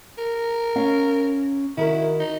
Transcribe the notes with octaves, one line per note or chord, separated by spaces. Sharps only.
A#4
C#4 F5
D#3 E4 F#4 A#4
D#4